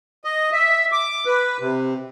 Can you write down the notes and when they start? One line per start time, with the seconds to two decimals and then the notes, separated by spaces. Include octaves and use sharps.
0.24 D#5
0.52 E5
0.92 D6
1.26 B4
1.60 C3